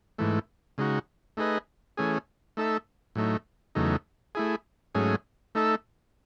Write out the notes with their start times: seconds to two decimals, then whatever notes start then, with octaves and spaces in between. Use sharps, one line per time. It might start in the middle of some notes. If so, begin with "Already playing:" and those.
0.18 G#2 E3 A3
0.78 C#3 G#3 D#4 F#4
1.37 A3 D#4 G#4 B4 D#5
1.97 E3 A3 C#4 G#4
2.57 A3 D#4 A4 E5
3.15 A2 F#3 A3 D#4
3.75 E2 C#3 F#3 A3 D#4
4.35 A3 E4 G#4
4.95 G#2 F#3 A3 C#4 G#4
5.55 A3 D#4 A4 E5